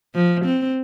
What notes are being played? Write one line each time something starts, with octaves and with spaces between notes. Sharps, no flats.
F3
C4